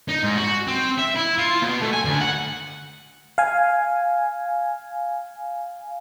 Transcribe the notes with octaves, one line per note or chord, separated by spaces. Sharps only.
D#4
G#2
F#4
C4
E5
E4
F4
B2
A3
G#5
D2
F#5
F5 G#5